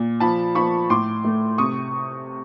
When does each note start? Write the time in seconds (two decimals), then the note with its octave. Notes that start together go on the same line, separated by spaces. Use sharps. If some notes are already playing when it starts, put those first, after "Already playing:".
Already playing: A#2
0.20 F3 A5 B5
0.55 F3 B5 C#6
0.90 A2 C6 D6
1.25 A3
1.58 C3 C#6 D#6